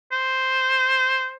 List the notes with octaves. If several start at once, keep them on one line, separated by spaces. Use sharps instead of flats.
C5